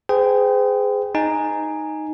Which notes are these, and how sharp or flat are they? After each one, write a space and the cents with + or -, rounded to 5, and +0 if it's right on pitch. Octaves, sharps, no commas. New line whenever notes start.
G#4 +0 C5 -40 G5 +0
D#4 -5 G#5 +0